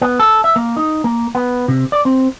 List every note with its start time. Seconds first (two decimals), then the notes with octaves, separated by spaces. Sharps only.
0.02 B3
0.19 A4
0.44 E5
0.56 A#3
0.77 D#4
1.04 A#3
1.35 B3
1.68 C3
1.92 D5
2.05 C4